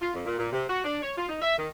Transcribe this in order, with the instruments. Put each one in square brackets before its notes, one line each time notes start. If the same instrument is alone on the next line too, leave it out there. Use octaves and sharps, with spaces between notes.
[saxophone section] F4
F2
A#2
A#2
C3
F#4
D4
C#5
F4
D#4
E5
D#3